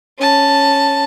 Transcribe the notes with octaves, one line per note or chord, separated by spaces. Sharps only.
C#4 A5